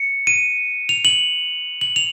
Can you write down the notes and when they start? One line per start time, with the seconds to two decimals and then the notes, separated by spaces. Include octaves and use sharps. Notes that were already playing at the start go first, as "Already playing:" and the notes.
Already playing: C#7
0.27 D#7
0.89 F7
1.05 F#7
1.81 F#7
1.96 F7